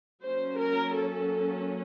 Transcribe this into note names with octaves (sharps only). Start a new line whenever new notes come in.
F#3 A#3 C#4 C5
A#4
A4